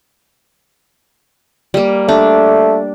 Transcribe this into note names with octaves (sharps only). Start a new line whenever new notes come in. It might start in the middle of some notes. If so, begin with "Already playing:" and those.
G3 A#3
A3 D4